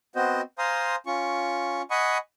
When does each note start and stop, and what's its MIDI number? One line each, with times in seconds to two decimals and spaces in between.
0.16 0.41 59
0.16 0.41 60
0.16 0.41 66
0.16 0.41 72
0.16 0.41 75
0.58 0.96 72
0.58 0.96 77
0.58 0.96 80
0.58 0.96 82
0.58 0.96 84
0.58 0.96 87
1.06 1.82 61
1.06 1.82 65
1.06 1.82 85
1.91 2.18 75
1.91 2.18 78
1.91 2.18 80
1.91 2.18 83
1.91 2.18 85
1.91 2.18 87